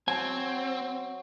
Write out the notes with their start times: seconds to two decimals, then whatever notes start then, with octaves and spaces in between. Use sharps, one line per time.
0.08 F#3 C4 G#5